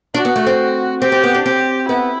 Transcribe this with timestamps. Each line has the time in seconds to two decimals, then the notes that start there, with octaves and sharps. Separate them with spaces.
0.14 D4 F#4
0.25 B3
0.36 A3
0.47 C4
1.02 C4 G4
1.12 C4
1.24 B3
1.35 D4
1.45 C4 G4
1.88 B3 E4